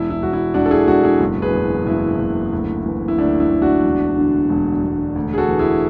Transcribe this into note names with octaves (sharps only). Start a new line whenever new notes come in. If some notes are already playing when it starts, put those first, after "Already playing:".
Already playing: E1 E4
E4
E1 F#4
E4
E1 D4 F#4
A4
E4 G#4
E1 D4 F#4
E4 G#4
F#1
G#4 B4
E2
F#1 E4
F#1
D2
E3
E4
D2 D4
E4
D2
D4 F#4
E1
D3
E1
E1
D2
G#4
F#4 A4
E3
E4 G#4